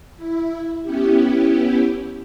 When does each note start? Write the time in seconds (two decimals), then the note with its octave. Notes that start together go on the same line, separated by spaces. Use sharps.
0.16 E4
0.82 B3 C#4 E4 G4